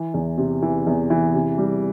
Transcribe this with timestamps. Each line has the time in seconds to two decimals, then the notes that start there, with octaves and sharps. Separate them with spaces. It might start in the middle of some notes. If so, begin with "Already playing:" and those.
Already playing: E3
0.14 E2
0.38 C3
0.62 E3
0.87 E2
1.10 E3
1.34 C3
1.58 G3